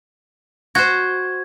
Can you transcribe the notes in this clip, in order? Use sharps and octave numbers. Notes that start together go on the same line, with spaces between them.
F#4 C5 G#6